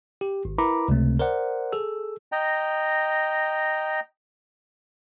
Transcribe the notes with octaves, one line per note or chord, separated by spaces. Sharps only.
G4
G#1
E4 A#4 B4 A#5 B5 D6
C#2 C3 A3 C4
A#4 C5 D5 F#5
G#4 A4 E6
D#5 G5 A#5